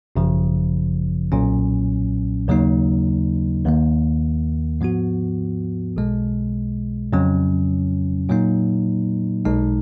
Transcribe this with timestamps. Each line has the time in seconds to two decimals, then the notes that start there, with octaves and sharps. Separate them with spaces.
0.16 G#1 F#2 C#3 F3
1.32 B1 A#2 F#3 C#4
2.48 D#2 C#3 F#3 A#3 D#4
3.65 D#2 D#3 A#3
4.81 G#2 F3 B3 F#4
5.97 B1 B2 G#3
7.13 F2 C#3 F#3 C#4
8.29 A#2 F#3 A#3 D#4
9.45 B1 B2 G#3 D#4